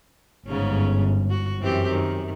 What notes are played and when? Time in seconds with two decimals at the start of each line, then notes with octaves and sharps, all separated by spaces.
0.47 G1 G#2 C#3 C#4
1.30 F#4
1.61 F#2 E3 C4 G4
1.89 D#3